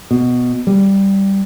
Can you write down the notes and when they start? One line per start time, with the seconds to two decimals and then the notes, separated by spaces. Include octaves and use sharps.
0.11 B2
0.67 G3